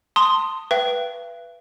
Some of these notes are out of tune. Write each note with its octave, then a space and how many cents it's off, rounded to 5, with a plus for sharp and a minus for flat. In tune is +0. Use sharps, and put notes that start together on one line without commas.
A5 +35 C6 +0 D#6 +0
B4 -5 E5 +45 G5 -20